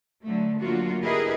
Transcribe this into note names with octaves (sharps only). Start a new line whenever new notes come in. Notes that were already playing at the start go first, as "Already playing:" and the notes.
D3 F#3 A3
D3 F#3 A3 A#3 F4 F#4
E4 G4 G#4 A#4 B4 D#5